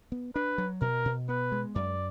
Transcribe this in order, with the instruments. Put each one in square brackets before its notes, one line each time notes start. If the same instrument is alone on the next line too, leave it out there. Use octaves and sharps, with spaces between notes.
[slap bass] B3
[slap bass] D4 [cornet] B4
[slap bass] F#3
[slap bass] B2 [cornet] A#4
[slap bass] B2
[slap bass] B3 [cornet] B4
[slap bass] G#3
[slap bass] F#2 [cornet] D5